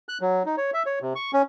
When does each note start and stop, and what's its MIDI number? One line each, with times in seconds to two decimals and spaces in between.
0.09 0.18 90
0.21 0.43 54
0.46 0.56 63
0.57 0.71 73
0.74 0.83 76
0.86 0.99 73
1.02 1.13 48
1.15 1.31 85
1.33 1.42 61